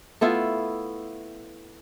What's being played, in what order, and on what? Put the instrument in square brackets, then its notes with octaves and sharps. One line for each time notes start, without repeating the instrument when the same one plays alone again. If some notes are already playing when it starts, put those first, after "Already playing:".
[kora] A3 B3 E4 F4